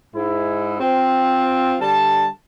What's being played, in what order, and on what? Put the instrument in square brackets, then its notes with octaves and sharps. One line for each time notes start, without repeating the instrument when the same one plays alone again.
[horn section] G#2 E4
C4 F4
D3 G3 A5